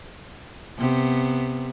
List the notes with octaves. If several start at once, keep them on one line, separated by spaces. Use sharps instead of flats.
C3 B3